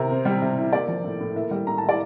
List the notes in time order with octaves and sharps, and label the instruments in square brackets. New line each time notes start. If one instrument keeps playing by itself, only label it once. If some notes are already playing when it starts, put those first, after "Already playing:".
Already playing: [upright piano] C3 A#4
C4
G3
C3
E4
A#3 D5
F3
A2
A2
A#3 E5
G3
A2 A#5
A5
E4
D5